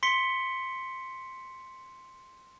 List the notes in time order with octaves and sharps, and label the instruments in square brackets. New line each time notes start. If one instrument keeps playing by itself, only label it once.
[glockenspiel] C6 B6 C#7 G7